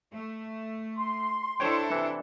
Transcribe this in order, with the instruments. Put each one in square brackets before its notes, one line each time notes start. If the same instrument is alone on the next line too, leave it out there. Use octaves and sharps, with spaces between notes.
[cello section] A3
[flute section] C6
[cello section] D4 E4 A4 [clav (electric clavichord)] C5 C#5 G5
[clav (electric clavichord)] C3 E3